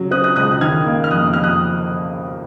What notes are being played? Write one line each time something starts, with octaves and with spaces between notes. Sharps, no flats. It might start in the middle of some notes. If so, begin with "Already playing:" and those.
Already playing: C#3 F#3
C4 D#6 F#6
D#6 F#6
C#2 D#6 F#6
F#6
D#3 F6 G#6
A#3
F6
F2 D#6 F#6
F2 F6
D#6 F#6